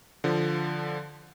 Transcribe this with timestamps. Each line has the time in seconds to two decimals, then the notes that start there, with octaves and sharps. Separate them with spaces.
0.24 D3 F3